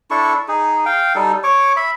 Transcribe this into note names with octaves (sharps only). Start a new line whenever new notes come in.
D4 E4 A4 C#6
D#4 G#4
F5 G5
G3 D#4 A4
C#5 C#6 D6
E5 B5